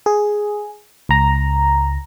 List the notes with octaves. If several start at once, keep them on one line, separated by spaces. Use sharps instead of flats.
G#4
C#2 A#5